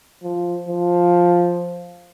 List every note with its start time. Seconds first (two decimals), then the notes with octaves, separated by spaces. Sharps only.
0.23 F3
0.69 F3